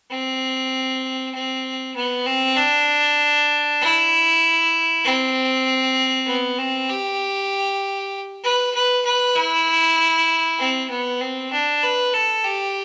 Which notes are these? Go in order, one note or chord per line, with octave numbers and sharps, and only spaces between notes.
C4
C4
B3
C4
D4
E4
C4
B3
C4
G4
B4
B4
B4
E4
C4
B3
C4
D4
B4
A4
G4